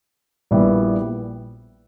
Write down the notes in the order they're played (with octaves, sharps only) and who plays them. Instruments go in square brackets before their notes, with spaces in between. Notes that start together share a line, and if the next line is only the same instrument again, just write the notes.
[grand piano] A#1 A#2 G3 B3 E4